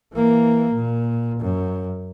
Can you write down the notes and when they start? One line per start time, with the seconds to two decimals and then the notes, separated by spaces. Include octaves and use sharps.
0.14 E3 A#3
0.74 A#2
1.41 F#2